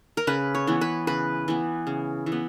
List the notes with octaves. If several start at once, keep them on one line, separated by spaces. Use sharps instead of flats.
A#4
C#3 B4
C#5
E3 B3
B4
C#3 B4
E3 B3
C#3
E3
B3